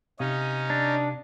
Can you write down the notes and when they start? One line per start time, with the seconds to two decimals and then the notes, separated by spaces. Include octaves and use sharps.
0.19 C3 C#4 D#4 F5 D#6
0.70 D4